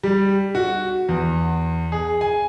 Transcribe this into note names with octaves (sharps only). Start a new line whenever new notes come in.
G3
F#4
E2
G#4
G#5